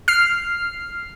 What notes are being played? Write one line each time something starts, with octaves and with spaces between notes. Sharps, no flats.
F6 C7